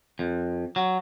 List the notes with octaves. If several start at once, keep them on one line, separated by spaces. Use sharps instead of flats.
F2
F#3